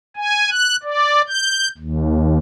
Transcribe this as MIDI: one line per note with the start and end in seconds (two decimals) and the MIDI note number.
0.16 0.50 80
0.50 0.76 90
0.83 1.21 74
1.28 1.68 91
1.78 2.38 39